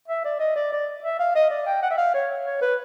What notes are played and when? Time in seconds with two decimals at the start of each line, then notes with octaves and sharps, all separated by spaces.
0.08 E5
0.25 D5
0.40 D#5
0.56 D5
0.72 D5
1.04 E5
1.19 F5
1.35 D#5
1.50 D5
1.67 G5
1.83 F#5
1.91 E5
1.97 F5
2.14 C#5
2.46 C#5
2.61 B4